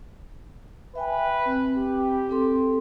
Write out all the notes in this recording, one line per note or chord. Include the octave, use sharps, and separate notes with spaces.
B4 E5 G5 G#5
C4
G4
C4 A4 C6